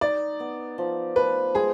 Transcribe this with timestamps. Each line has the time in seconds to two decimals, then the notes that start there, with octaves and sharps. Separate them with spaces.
0.01 D#4 D5
0.40 B3
0.78 F3
1.16 F3 B4
1.55 G#3 G#4